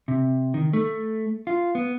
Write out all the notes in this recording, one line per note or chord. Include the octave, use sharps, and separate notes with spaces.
C3
D#3
A3
F4
B3